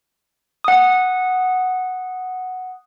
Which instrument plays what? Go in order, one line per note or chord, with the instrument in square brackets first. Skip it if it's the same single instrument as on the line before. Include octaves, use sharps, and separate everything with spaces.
[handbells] F#5 D#6